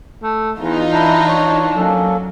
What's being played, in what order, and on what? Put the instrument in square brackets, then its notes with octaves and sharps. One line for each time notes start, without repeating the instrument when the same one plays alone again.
[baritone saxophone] A3
[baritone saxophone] E2 [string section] E3 D#4 F4
[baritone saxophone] D4 [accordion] E4 A#5 G6
[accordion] C#5
[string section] F#3 [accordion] A#3 C#4 A4